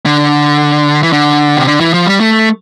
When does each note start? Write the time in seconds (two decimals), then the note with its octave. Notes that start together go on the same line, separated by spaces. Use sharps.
0.06 D3
1.03 E3
1.13 D3
1.57 C3
1.66 D3
1.80 E3
1.94 F3
2.07 G3
2.20 A3